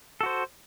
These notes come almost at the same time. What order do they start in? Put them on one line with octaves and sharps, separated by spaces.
A4 F#4 C5